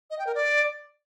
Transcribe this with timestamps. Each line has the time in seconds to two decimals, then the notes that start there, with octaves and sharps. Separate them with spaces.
0.10 D#5
0.19 G5
0.27 A#4
0.35 D5